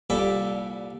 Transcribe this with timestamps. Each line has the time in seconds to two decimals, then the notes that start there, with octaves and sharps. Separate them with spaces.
0.10 C2 A#2 G3 A4 D5 B5